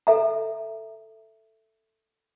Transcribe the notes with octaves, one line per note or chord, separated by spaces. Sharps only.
A4 E5 A#5